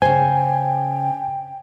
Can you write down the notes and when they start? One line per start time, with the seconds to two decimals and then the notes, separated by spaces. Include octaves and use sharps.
0.02 C#3 C5 G5 G#5